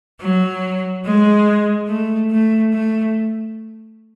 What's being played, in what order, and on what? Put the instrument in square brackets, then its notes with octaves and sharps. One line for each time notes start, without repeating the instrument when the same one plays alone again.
[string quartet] F#3
G#3
A3
A3
A3